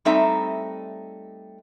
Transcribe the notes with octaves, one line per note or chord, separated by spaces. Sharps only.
G3 A3 C4 D#4 E5 A#5